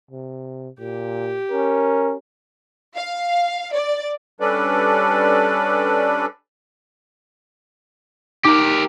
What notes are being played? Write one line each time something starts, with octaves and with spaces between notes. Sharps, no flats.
C3
A#2 G4
C#4 A#4
F5
D5
G3 C#4 D4 A4 B4 D5
D#4 G4 A#4 D6